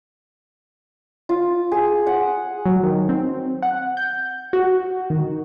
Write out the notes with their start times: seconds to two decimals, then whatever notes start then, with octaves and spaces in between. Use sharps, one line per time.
1.29 F4
1.72 G#4
2.07 F#5
2.66 F#3
2.83 D#3
3.09 C4
3.63 F#5
3.97 G6
4.53 F#4
5.10 D#3